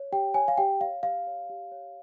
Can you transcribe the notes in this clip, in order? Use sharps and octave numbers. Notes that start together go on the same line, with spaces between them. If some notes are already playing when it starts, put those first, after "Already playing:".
Already playing: C#5
G4 G5
C#5 G#5
F5
G4 G5
C#5 F5
G4 F5
C#5
G4
C#5